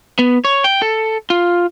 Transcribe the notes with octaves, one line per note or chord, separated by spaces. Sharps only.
B3
C#5
G5
A4
F4